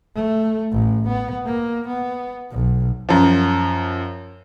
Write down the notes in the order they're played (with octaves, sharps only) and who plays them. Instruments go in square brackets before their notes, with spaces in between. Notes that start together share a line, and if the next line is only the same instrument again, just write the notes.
[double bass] A3
A1
B3
A#3
B3
B1
[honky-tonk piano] F#2 F3